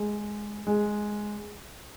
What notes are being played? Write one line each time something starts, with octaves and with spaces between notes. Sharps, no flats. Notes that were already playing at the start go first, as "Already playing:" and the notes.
Already playing: G#3
G#3